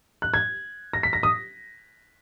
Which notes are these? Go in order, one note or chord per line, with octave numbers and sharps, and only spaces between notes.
F#6
G#6
A#6
B6
A#6
D#6